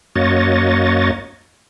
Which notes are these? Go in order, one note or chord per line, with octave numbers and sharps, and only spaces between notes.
F#2 A#3 F#4 C#5 D#5 A6